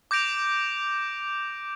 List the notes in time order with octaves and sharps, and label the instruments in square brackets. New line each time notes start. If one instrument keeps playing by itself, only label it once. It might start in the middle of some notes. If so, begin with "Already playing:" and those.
[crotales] D6 G6 A#6 D7 F7